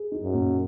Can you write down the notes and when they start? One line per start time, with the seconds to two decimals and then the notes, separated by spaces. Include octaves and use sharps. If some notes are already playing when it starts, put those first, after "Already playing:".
Already playing: G#4
0.12 D#4
0.23 F#2
0.34 A#2